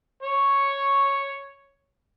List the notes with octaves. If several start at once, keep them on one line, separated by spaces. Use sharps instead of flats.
C#5 C#6